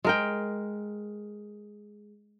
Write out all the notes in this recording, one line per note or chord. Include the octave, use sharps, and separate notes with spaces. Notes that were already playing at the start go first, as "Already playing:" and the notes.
G#3 A#4 G5